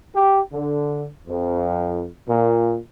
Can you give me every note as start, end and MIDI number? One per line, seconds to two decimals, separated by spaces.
0.15 0.42 67
0.52 1.06 50
1.27 2.05 41
2.28 2.77 46